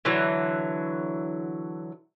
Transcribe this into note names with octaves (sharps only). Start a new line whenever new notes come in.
D3 E3 F#3